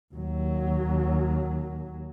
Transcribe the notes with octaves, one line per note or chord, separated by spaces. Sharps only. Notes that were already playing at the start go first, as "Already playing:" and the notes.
D#2 F#3